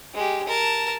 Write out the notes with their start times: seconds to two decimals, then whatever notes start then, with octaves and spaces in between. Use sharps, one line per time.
0.14 G#3 G4
0.48 A#4 A5